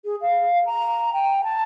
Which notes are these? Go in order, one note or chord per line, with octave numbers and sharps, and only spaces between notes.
G#4
F5
A#5
G5
A5